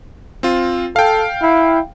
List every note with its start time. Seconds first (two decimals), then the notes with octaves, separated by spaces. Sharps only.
0.43 C4 F4
0.96 A4 F5 G5
1.42 E4